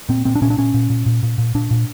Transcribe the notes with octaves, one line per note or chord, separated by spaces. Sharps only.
A#2 C4
A#2 C4
D4
A#2 C#4
D4
A#2 C#4
A#2
A#2
A#2
A#2
A#2
A#2 D4
A#2